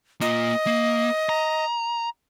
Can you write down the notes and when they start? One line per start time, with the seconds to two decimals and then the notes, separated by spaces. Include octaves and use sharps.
0.21 A#3 F4 D#5
0.67 A#3
1.29 A#5